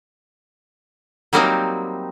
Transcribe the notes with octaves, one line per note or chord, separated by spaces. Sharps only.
F#3 G3 A#3 C4 D#4 G4